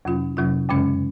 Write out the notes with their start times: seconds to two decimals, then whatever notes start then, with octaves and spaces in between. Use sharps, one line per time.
0.05 F2 C3 F#3 C#4 F4
0.37 F2 C3 F#3 C#4 F4
0.69 F#2 C#3 G#3 C#4